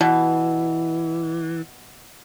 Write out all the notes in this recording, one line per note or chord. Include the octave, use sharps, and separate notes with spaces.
B2 E3